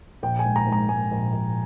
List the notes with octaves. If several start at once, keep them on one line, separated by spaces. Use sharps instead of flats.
A#1 G5
G#5
G#2
A#5
G#2
A#5
G#2 G#5
A#1
A#1